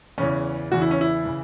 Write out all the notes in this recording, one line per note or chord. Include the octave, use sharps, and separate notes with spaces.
E2 C#3 E3 C#4
E2 C#3 E3 F#4
E4
C#4
E4
C#3 E3